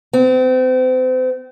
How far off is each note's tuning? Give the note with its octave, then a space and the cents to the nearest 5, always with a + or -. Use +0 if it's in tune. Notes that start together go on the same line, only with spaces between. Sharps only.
C4 -35